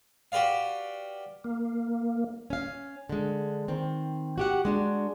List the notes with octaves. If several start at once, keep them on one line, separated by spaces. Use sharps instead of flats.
F#4 G4 B4 D5 F5
A#3
C#4 F5
D3 G#3
D#3 C4
F#4 G4 F#5
G#3 D4 F#4